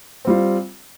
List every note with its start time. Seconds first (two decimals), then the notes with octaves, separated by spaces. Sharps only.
0.25 C4
0.27 G3
0.30 F4